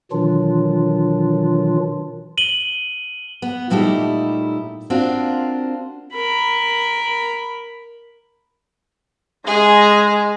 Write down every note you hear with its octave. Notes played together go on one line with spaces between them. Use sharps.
B2 D#3 E3 F#3 D4 F4
D#7 F#7 G7
B3
A#2 G3 A3 D#4 E4 G4
A#3 C4 D4 F4 F#4
A#4 B5
G#3 G#4